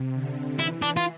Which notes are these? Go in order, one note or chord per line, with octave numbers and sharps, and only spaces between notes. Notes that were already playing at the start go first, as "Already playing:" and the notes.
Already playing: C3
D3
E3 E4
D4
F4